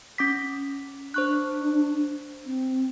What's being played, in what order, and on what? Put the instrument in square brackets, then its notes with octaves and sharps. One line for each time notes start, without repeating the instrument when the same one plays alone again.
[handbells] C#4 D6 B6
[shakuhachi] D4 [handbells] C5 C#6 F#6
[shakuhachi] C4